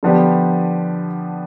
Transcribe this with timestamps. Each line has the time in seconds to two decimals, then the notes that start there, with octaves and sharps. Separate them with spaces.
0.03 D3 F3 B3 D4 G4